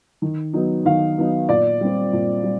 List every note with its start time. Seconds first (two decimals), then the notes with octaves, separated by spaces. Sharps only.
0.22 D#3
0.53 F#3 B3 D#4
0.85 D#3 F5
1.18 F#3 B3 D#4
1.49 A#2 D5
1.81 G3 C4
2.13 A#2
2.44 G3